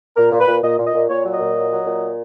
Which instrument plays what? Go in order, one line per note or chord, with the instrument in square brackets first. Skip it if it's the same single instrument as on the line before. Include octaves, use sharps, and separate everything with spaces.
[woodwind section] A#2 A#4
A#2
B4
A#2
A#2 D#5
A#2
D#5
A#2
A#2 C#5
F#3
D#5
A#2
F#3
F#3
A#2